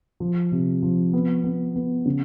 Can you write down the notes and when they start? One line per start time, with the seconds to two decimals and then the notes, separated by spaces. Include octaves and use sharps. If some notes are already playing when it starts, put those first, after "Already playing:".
0.20 F3
0.52 C3
0.83 F3
1.13 B3
1.44 B3
1.75 B3
2.06 C#3